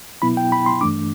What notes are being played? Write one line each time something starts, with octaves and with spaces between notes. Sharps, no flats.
B2 F#3 B3 E4 B5
G5
B5
C6
G2 E3 A3 D4 D6